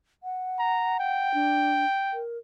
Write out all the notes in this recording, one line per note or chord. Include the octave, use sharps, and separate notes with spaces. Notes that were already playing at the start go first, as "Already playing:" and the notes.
F#5
A#5
G5
D4
A#4